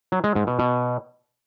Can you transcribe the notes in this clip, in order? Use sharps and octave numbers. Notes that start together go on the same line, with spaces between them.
F#3
G#3
G#2
B2
B2